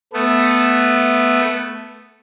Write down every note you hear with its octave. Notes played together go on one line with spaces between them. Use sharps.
A3 B3